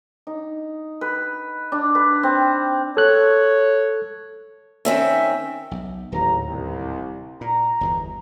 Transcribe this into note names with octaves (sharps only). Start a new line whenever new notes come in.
D#4
B4
D4
B4
C4
A4 C#5 F#6
D#3 C4 C#4 E5
B1
D1 A1 D#2 A#2 A#5
C2
A#2 A#5
G1 E2 B2